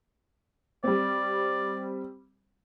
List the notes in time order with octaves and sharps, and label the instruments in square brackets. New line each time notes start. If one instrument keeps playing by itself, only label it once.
[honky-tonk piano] G3 C4 [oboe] D5